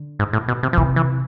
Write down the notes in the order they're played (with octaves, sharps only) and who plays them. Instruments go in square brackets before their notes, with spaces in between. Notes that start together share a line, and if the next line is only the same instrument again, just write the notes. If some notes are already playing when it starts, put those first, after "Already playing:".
Already playing: [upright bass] D3
[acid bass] G#2
A2
B2
C3
F3
[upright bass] C3 [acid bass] E3
[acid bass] E3